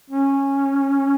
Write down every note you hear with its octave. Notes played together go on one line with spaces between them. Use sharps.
C#4